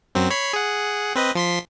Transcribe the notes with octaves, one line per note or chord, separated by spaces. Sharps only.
F#2 F#3 C4
C#5 B5 C7
G#4 F#5
C4 B4 D#5
F3 C6 B6